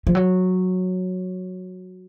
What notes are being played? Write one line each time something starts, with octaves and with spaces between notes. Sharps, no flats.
F3
F#3